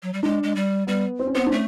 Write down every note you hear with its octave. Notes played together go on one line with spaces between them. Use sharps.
F#3
G3
G#3 D4
G#3
G3
G3 B3
C4
C#4
B3 C4
D4
A3 C#4